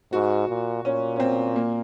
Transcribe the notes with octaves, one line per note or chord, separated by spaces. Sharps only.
G#2 F#4
A#2
A#2 C#4
C#4
C4
A#3